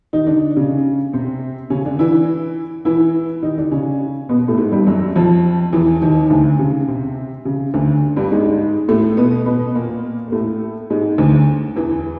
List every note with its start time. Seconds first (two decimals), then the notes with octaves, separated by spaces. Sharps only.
0.13 D#3 D#4
0.27 D3 D4
0.57 C#3 C#4
1.13 C3 C4
1.70 C#3 C#4
1.85 D3 D4
1.99 E3 E4
2.85 E3 E4
3.43 D#3 D#4
3.58 D3 D4
3.71 C#3 C#4
4.29 B2 B3
4.48 A2 A3
4.58 G#2 G#3
4.72 G2 G3
4.87 F#2 F#3
5.16 F2 F3
5.73 E2 E3
6.02 D#2 D#3
6.30 D2 D3
6.59 C#3
6.88 C3
7.45 C#3
7.74 D2 D3
8.17 G2 G3
8.32 G#2 G#3
8.89 A2 A3
9.17 B2 B3
9.46 B2 B3
9.75 A#2 A#3
10.28 A#3
10.32 A2 A3
10.90 G#2 G#3
11.18 D2 D3
11.76 E2 E3